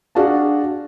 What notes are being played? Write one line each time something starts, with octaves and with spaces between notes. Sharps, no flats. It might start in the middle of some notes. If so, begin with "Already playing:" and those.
D4 F#4 G#4 F5 A5